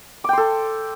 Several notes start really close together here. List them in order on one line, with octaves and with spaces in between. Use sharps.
D6 G5 C6 A4